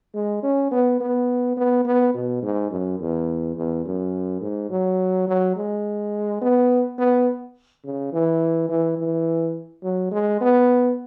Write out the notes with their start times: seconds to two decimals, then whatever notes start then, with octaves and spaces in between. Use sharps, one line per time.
0.14 G#3
0.43 C#4
0.71 B3
1.00 B3
1.57 B3
1.85 B3
2.14 B2
2.42 G#2
2.71 F#2
2.99 E2
3.56 E2
3.86 F#2
4.41 G#2
4.70 F#3
5.28 F#3
5.56 G#3
6.41 B3
6.98 B3
7.84 C#3
8.12 E3
8.69 E3
8.98 E3
9.83 F#3
10.12 G#3
10.40 B3